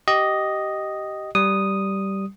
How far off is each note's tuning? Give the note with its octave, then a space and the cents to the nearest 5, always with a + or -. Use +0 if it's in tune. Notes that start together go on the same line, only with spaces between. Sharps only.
G4 -20 D#5 +0
G3 -10 D#6 -5